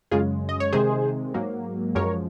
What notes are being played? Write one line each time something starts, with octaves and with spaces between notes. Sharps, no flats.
F#2 C#3 G#3 F4 G#4
D#5
C#5
C3 D#3 G#3 G#4 C5
G#2 F#3 A#3
F#2 F3 G#3 A#4 C#5